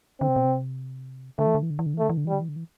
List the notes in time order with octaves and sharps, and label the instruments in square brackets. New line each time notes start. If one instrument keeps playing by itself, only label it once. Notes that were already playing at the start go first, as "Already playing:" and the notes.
[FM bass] D3 [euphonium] C4
[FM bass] C3
B2
C3
[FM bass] D3 [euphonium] A3
[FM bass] E3
D3
E3
D3
E3
D3
E3
[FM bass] D3 [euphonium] A3
[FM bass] E3
D3
[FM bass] E3 [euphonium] G3
[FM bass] D3
E3
D3
E3